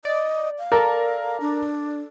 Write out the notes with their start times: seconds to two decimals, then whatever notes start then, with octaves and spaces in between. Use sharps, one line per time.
0.05 D5 D#5
0.59 F5
0.72 A4 A#4 D5
1.41 D4